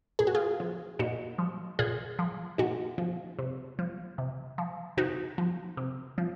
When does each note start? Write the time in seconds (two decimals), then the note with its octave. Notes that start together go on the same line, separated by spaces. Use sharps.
0.19 A#2 G#4
0.27 F#4
0.35 F4 G#4
0.60 F3
0.99 A#2 D#4 F#4
1.38 F3
1.79 A#2 F4 G#4
2.19 F3
2.58 A#2 D#4 F#4
2.98 F3
3.39 C3
3.79 F3
4.18 C3
4.58 F3
4.97 C3 D#4 F#4
5.38 F3
5.77 C3
6.18 F3